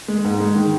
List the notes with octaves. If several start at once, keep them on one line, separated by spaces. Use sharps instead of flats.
G#3
G#2
G#3
D#3